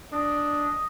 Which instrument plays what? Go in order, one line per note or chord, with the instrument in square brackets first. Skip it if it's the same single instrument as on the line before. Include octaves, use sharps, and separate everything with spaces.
[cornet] D4 [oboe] D#5